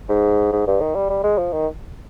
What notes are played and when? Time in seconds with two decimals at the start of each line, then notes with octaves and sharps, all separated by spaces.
0.09 G#2
0.52 G#2
0.67 G2
0.81 D#3
0.95 G3
1.10 G3
1.24 G#3
1.38 F3
1.53 D#3